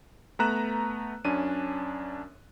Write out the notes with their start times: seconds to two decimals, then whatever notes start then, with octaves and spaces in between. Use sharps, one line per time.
0.39 A3 B3 B4 A#5 F#6 E7
1.25 F#2 C#4 D4 D#7